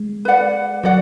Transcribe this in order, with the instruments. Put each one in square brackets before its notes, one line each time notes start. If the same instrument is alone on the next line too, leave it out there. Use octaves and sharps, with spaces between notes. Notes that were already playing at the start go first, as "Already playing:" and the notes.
Already playing: [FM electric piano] G#3
[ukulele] B4 D5 F#5
[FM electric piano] F#3 [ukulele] F#4 D5 F#5